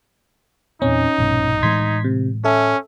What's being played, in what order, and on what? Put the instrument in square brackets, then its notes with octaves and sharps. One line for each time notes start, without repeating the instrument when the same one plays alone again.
[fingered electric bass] E2 A#2 C4 [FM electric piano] C#4 [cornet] D#4
[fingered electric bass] A#1 G2 B2
[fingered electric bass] A2 E3 G#3 [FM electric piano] C6 G#6 B6
[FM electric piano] C3
[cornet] C#4 [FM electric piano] A4 E5